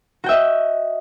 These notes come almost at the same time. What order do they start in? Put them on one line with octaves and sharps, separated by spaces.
F#4 G5 E5 D#5